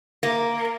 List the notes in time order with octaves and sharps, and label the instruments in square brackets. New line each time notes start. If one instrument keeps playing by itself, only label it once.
[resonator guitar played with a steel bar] A#3